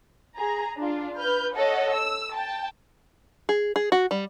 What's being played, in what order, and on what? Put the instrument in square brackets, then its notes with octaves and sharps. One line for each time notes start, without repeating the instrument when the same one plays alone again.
[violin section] G#4 A#5
D4 F4
B4 F6 G6
A4 C#5 D#5 F#5
E6
G5 A5
[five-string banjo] G#4
G#4
F#4
G3